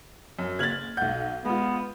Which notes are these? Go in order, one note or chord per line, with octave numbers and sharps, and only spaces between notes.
F#2
F#1 F6 G#6 A6 F#7
B1 F#5 G6
G#3 B3 F4